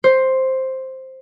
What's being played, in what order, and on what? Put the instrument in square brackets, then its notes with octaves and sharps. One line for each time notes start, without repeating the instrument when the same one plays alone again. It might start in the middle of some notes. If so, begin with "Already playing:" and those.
[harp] C5